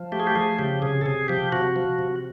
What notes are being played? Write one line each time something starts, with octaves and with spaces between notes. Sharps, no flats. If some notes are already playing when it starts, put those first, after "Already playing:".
Already playing: F3
A3 G4
G#4
G4
F3 G#4
C#3 G4
C3 G#4
A4
C3 G#4
F3 G4
C3 F#4
F3
C3